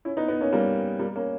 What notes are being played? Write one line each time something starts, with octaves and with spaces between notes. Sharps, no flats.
C#4 E4
B3 D#4
B3 D#4
A#3 C#4
G3 A#3
G3 A#3
A#3 C#4